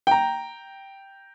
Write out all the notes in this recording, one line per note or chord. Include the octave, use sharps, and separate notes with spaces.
G5 A#5